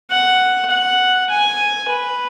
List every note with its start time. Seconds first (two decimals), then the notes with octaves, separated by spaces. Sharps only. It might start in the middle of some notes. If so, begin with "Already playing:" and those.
0.11 F#5
0.70 F#5
1.30 G#5
1.88 B4